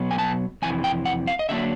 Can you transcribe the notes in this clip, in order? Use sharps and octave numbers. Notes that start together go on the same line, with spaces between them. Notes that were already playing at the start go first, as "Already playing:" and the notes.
Already playing: B2 F#3 B3
G#5
A5
F2 C3 E3 G#5
G5
F#5
F5
D#5
D3 F#3 A#3 D4 E5